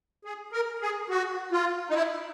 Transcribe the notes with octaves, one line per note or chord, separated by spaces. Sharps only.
G#4
A#4
G#4
F#4
F4
D#4
E4